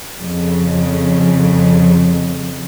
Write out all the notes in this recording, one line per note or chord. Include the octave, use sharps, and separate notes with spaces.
F2 C#3